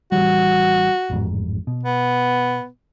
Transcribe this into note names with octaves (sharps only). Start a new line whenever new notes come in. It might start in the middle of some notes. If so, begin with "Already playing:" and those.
A1 E3 G3 F#4
A1 F2 G#2
B2
B3